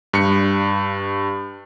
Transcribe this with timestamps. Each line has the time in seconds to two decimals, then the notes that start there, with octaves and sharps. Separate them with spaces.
0.13 G2 C#7